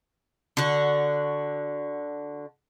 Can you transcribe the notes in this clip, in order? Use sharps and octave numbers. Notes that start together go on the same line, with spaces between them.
D3 F#4